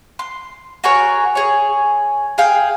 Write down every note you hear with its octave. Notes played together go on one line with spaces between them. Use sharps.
C6
F#4 G#4 A#4 C#5
G#4 C#5
G#4 F5 G5